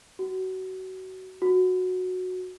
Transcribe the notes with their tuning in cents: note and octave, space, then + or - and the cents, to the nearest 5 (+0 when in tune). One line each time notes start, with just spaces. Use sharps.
F#4 +25
F#4 -10